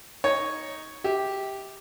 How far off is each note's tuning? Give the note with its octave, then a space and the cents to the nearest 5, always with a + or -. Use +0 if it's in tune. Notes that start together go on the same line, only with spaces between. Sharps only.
D#4 +0 C#5 +0
G4 +0 E5 -30